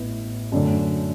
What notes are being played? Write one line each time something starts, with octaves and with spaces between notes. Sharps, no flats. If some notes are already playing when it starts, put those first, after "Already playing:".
Already playing: A1 A2 B3 E4
F#2 D3 A3 D4